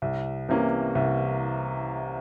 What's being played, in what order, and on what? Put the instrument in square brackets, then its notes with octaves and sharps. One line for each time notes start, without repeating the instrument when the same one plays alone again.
[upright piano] C2
C3 E3 A#3 C#4
C2